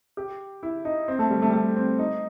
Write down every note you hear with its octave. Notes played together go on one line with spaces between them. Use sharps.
G4
E4
D#4
C4
A3
G3
A3
G3
A3
C4
D#4